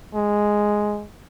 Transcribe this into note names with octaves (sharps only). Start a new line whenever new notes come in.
G#3